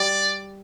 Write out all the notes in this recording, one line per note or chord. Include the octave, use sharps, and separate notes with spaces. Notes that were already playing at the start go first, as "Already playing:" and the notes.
Already playing: G3 D5